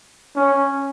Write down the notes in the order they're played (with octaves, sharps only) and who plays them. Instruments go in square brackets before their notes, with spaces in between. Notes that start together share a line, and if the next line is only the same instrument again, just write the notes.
[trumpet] C#4